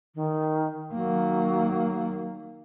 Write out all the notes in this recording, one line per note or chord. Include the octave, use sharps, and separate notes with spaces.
D#3
D#3 F#3 A#3